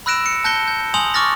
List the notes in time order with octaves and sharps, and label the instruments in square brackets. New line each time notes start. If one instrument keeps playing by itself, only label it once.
[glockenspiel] B5 E6 F#6 A#6 D7 E7
C#7
A5 F#6 G6 A#6 C#7 G7
G6
G#5 C6 D#6 G6 F7 F#7
C#6 D6 F6 A6 A#6